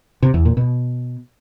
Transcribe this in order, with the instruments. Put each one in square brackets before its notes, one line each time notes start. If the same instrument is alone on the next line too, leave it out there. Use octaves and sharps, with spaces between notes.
[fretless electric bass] C3
E2
A#2
B2